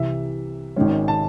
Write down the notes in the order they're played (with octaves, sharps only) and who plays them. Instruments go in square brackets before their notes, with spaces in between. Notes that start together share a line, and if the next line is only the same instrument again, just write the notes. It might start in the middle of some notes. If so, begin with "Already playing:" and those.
Already playing: [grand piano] C2 C3 E3 E5
G#1 G#2 D#3 G#3 C#4
A5